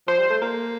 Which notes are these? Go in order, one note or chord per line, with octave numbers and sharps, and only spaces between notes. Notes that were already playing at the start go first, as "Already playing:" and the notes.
F3 C5
G3
A3
A#3